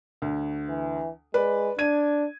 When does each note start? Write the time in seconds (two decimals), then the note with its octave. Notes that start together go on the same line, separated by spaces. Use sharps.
0.22 D2
0.69 E3
1.34 G#3 B4 D5
1.79 D4 G#6 D#7